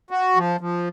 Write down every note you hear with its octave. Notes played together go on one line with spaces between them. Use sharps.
F#4
F3
F3